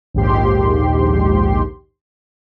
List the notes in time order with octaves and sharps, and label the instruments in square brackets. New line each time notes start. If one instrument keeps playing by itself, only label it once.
[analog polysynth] A#1 D#2 G#2 G4 C6